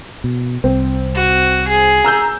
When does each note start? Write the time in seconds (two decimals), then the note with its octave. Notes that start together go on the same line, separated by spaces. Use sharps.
0.24 B2
0.64 C2 C4
1.16 F#4
1.68 G#4
2.05 A#5 E6 G6